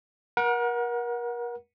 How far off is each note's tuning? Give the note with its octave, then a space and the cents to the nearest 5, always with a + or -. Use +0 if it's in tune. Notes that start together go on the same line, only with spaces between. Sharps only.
A#4 +35 F#5 -10